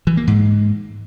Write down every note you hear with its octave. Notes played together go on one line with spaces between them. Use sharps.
E3
A#3
G#2